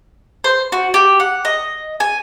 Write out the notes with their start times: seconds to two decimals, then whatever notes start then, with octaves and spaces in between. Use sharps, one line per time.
0.44 C5
0.72 F#4
0.94 G4
1.20 F#5
1.45 D#5
2.00 G#5